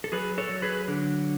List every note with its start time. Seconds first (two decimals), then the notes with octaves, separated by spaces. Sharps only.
0.04 A4
0.12 F#3 G#4 B4
0.38 A4 C#5
0.49 F#3
0.62 G#4 B4
0.88 D3